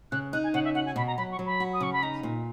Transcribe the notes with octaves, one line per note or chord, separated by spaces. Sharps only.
C#3 F#6
D#4 F#6
G#5
C#3 F#5
E5
F#4 F#5
G#5
B2 B5
A#5
F#3 B5
C#6
F#3
B5
F#4
D#6
C#3 C#6
B5
D#4 A#5
A#2